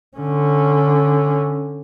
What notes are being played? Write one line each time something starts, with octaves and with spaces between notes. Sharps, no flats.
D3 C#4